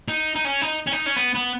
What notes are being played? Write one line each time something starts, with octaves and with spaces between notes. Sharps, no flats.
D#4
D#4
C#4
D#4
C#4
D#4
C#4
B3
B3